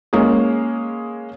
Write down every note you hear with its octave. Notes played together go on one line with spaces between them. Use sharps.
G#3 A#3 C#4 G#4